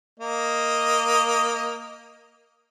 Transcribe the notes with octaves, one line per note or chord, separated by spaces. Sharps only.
A#3 D#5